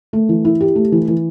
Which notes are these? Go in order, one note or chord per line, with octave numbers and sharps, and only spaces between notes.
A3
E3
E4
G4
A3
E3
E3